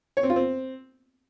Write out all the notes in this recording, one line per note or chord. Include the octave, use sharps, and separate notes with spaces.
C#5
C4
F4
C4